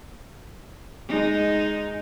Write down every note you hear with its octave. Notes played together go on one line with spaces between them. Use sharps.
G#3 D#4